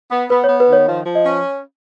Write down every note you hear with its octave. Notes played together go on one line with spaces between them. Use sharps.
B3
B3 B4
C#5
B3
B4
D#3 C#5
F3
F3
D#5
C#4